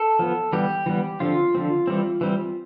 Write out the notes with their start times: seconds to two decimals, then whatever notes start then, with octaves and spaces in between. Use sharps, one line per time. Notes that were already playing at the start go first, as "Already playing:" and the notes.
Already playing: A4
0.19 F3 B3
0.53 E3 G3 B3 G4
0.86 E3 G3 B3
1.20 D3 F3 C4 F4
1.55 D3 F3 C4
1.87 E3 G3 C4
2.21 E3 G3 C4